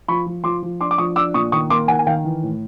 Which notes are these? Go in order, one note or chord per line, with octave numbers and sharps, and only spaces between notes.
F3 B5 C#6
F3
F3 C6 D6
F3
D4 C6 D6
D6
F3 C#6 D#6
D4 D6 E6
A#2 C#6 D#6
D#3 C#6 D#6
A#3 C6 D6
D#3 F#5 G#5
G#5
D#3 F5 G5
E3
A2